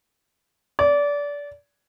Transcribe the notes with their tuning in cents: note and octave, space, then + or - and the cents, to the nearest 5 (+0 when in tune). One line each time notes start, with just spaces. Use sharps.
D5 -25